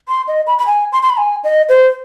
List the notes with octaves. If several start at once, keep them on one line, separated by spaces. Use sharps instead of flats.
C6
D#5
B5
B5
G#5
C6
C6
B5
G#5
D#5
C5